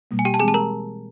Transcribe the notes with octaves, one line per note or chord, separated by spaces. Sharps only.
B2 G3 A#3
G#5
G4 G5
A5
E3 G#3 C4 G#4 G#5
A5
A#4 A#5